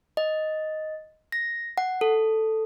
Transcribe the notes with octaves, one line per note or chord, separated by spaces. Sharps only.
D#5
A#6
F#5
A4